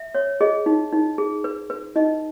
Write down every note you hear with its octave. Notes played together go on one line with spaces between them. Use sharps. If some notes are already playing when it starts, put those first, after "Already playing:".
Already playing: E5
C#5
G#4 D#5
D#4
D#4
G#4
B4
B4
D#4 D#5